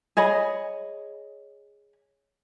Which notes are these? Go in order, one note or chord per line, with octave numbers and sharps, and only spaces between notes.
G#4 C#5 D#5 B5